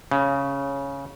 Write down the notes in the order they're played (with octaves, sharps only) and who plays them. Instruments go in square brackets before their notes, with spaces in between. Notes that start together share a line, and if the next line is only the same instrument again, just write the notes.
[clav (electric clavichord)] C#3